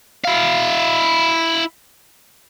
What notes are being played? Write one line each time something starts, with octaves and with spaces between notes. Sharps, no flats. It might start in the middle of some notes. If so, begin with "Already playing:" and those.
E4 F5